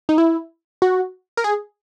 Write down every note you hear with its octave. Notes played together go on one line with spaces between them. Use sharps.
D#4
E4
F#4
A#4
G#4